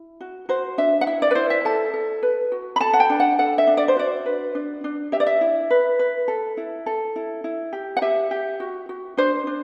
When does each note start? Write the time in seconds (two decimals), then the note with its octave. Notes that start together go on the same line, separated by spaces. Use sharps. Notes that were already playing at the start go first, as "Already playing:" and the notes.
Already playing: E4
0.21 F#4
0.49 F#4 C5
0.78 D4 E5
1.01 F#5
1.06 E4 E5
1.22 D5
1.31 B4
1.35 E4 C5
1.50 E5
1.65 A4 A5
1.94 A4
2.23 B4
2.52 F#4
2.76 B5
2.80 A4 A5
2.93 F#5
3.00 G5
3.10 D4
3.20 F#5
3.39 A4 F#5
3.58 E5
3.67 D4
3.77 D5
3.88 C5
3.96 F#4 D5
4.26 B4
4.55 D4
4.84 D4
5.12 G4 E5
5.20 D5
5.26 E5
5.41 E4
5.70 B4
5.99 B4
6.28 A4
6.57 E4
6.86 A4
7.16 E4
7.44 E4
7.73 G4
7.97 F#5
8.02 G4 E5
8.31 G4
8.60 F#4
8.89 F#4
9.17 D4 C5
9.47 D4